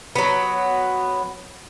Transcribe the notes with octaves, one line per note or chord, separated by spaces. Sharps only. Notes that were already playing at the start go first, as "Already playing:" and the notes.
F#3 B3